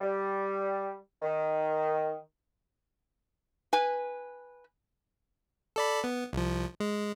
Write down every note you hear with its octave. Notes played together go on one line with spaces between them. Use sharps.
G3
D#3
B4 G#5
A4 D5 B5
B3
C2 F3
G#3